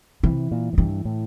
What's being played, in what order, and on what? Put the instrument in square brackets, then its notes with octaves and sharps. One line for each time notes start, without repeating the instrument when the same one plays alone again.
[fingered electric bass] C3 [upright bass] E3
[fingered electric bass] A#2
A2
[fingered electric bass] G2 [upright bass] E3
[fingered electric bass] A2